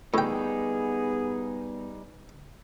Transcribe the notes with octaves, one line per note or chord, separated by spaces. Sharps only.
A2 G3 B3 D#4 G#4 G5